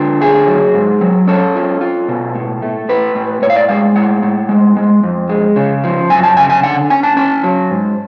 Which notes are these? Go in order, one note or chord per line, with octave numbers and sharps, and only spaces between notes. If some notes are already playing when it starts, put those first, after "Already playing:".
Already playing: D3 F4
A3 G#4
F#3
G#2
F#3
C#4 A4
F4
F4
B2
A2
A3
A2 B4
A2
A2 C#5
F5
D5
G#3 F5
A2 F#5
A2
G#3
G#3
F2
G#3
C#3
F3
F#2 G#5
A5
C#3 G#5
G#5
D3 F#5
C#4 G#5
A5
C#4 A5
F#3
G#2